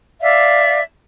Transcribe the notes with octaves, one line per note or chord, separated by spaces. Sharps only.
D5 E5 F5